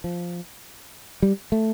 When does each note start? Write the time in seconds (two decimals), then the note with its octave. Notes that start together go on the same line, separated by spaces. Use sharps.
0.04 F3
1.22 G3
1.52 A3